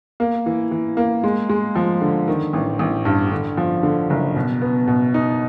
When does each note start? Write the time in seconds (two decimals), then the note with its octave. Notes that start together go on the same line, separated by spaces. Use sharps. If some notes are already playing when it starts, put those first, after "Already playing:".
0.20 A#3
0.46 E3
0.71 E3
0.97 A#3
1.24 G#3
1.49 G#3
1.75 F3
2.01 D3
2.28 D#3
2.53 A1
2.79 A1
3.05 G2
3.31 D3
3.57 F3
3.83 D3
4.10 F#1
4.36 B2
4.61 B3
4.87 B2
5.14 D#4